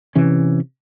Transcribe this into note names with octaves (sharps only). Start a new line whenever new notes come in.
C3 E3 C#4